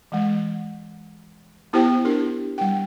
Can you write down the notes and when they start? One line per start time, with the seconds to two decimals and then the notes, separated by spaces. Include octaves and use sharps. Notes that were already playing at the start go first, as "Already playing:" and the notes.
0.12 E3 G#3
1.73 B3 E4 G4 C5 G5
2.05 D4 G4 A#4
2.58 G3 G5